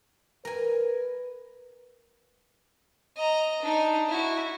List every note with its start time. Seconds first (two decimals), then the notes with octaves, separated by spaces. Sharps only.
0.45 A#4 B4 G#5
3.17 D#5 A#5
3.62 D4 D#4
4.09 E4 F#4